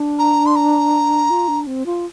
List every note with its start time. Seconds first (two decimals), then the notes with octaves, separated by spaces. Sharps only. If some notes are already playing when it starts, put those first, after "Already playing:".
Already playing: D4
0.19 A#5
0.46 C6
0.56 A#5
1.30 F4
1.48 D4
1.67 C4
1.86 F4